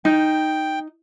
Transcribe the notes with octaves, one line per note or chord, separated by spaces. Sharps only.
D#4 G5